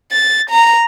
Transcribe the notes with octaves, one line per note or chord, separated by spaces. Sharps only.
A6
A#5